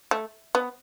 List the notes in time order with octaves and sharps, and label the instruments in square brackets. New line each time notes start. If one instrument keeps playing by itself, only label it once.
[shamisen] A3
B3